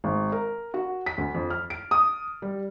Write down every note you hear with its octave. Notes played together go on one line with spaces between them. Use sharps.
G#1
A#4
F#4
B6
D2
F2
F6
D7
D#6
G3